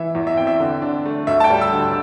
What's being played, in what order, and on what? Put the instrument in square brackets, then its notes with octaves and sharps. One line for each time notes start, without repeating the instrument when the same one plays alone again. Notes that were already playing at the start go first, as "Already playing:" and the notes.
Already playing: [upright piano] E3 E5
E2
E5
C4 G5
E5
D3
D4
A3
D2 E5
A5
G5
G3
E6
D3